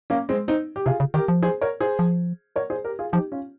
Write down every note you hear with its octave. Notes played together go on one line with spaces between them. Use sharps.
A#3 C#4
G#3 C4
C4 D#4
G4
C3 F4 G#4
C#3
D#3 G4 A#4
F3
G#4 C5
A#4 C#5
G#4 C5
F3
A#4 C#5
G#4 C5
G4 A#4
F4 G#4
F3 D#4 G4
C#4 F4